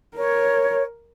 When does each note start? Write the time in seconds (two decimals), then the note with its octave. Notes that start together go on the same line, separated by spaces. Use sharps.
0.17 A#4 C#5